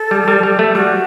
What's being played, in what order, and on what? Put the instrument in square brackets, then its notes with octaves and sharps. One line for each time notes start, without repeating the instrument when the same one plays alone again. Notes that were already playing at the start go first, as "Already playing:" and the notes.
Already playing: [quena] A4
[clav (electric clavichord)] G3
G3
G3
A3
[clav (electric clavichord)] G3 [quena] F#4